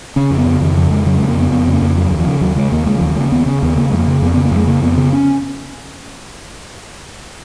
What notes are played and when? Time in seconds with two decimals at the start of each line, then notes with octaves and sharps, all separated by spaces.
0.16 C#3 C#4
0.30 F2
0.38 B3
0.47 C#3
0.61 F2 D#3
0.76 C#3 F3
0.91 F2 G#3
1.06 C#3 F#3
1.17 G#3
1.22 F2
1.29 A#3
1.37 C#3 B3
1.51 F2 B3
1.67 C#3
1.73 A#3
1.81 F2
1.96 C#3 F#3
2.11 D#2
2.19 F3
2.27 C#3
2.41 D#2 F#3
2.56 C#3 G#3
2.72 D#2 A#3
2.86 C#3 G#3
2.98 F3
3.01 D#2
3.09 F#3
3.16 C#3 G#3 A#3
3.32 D#2 B3
3.46 C#3 C#4
3.62 D#2 B3
3.77 C#3 A#3
3.90 F2 G#3
3.99 A#3
4.07 C#3
4.22 F2 B3
4.34 C#3 B3
4.45 A#3
4.52 F2 G#3
4.67 C#3 A#3
4.82 F2 B3
4.97 C#3 B3
5.13 C#4